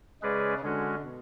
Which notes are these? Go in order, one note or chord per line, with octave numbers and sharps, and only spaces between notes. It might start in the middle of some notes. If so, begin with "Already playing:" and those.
C#3 G#3 C#4 G#4 B4 D5
C#3
D3 G#3 C#4 F#4
B2